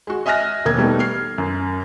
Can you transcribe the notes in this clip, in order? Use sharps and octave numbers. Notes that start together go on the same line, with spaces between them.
G#3 F#4
D#5 E5 G#5 F6 F#6 A#6
E1 A#3 G#6
B2 G3 A3 B3 D#4
F6 C7
F#2